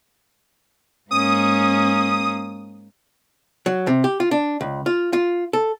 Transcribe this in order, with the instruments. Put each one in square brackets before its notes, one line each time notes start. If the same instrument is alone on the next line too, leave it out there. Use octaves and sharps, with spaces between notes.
[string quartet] G#2 A#3 C#4 [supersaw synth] D#6
[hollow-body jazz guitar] F#3
C3
G4
F4
D4
C#2
F4
F4
A4